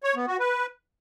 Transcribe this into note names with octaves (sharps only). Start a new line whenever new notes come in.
C#5
B3
F#4
B4